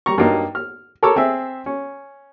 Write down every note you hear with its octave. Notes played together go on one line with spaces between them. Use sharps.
G3 A#5 C#6
G2 F#3 A#3 D#4
F6
A4 A#4 C#5 A5 D6 E6
C4 G#4 E5
C#4